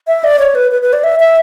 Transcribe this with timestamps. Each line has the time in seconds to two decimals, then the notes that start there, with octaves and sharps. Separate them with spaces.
0.07 E5
0.24 D5
0.39 C#5
0.55 B4
0.71 B4
0.82 B4
0.93 D5
1.04 E5
1.20 E5